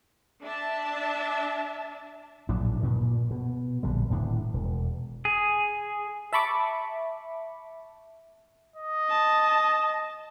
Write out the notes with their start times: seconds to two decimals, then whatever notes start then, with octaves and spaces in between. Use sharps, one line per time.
0.42 D4 E5 A5
2.49 A#1 A2 F#3 D4
2.79 G2 A#2
3.31 B2
3.83 A#1 D3 G3
4.10 D#1 A2 D4
4.54 E1
5.25 G#4
6.33 E5 A5 B5 C#6 D6
8.76 D#5
9.10 A5